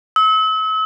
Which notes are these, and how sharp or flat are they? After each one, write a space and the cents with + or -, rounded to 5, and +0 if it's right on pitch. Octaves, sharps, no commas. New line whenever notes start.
E6 -40